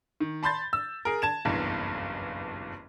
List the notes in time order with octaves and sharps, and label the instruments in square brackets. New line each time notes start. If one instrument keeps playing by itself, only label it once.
[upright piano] D#3
A5 B5 C6 G6 A6
E6
G#4 A#4
A5 G#6 E7
F#1 B1 E2 G2